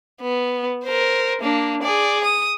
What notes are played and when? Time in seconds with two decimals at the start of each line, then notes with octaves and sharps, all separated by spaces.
0.21 B3
0.84 A#4 C5
1.41 A#3 D4
1.82 G#4 D5
2.24 D#6